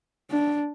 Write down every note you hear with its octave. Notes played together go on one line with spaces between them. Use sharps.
D4